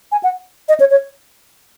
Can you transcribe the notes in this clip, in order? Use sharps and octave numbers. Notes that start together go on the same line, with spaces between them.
G#5
F#5
D#5
C#5
C#5